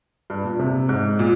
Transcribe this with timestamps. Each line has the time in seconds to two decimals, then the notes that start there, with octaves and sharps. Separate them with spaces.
0.30 G2
0.44 A#2
0.59 C3
0.89 G#2
1.19 A#2